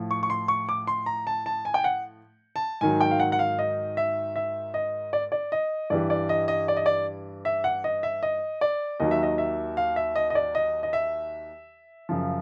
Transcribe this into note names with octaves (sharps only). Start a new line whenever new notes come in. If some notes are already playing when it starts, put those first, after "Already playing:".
Already playing: A2 F3
C#6
C#6
C6
C#6
D6
C6
A#5
A5
A5
G#5
G5
F#5
A5
G#2 D#3 F#3 G#5
G5
F5
F#5
F#5
F5
D#5
E5
E5
D#5
D5
D5
D#5
G2 E3 G3 D5
D5
D#5
D#5
D5
D#5
D5
E5
F#5
D#5
E5
D#5
D5
D#2 D#3 F#3 D#5
E5
D#5
E5
F5
E5
D#5
D#5
D5
D#5
D#5
E5
F#2 C#3 F3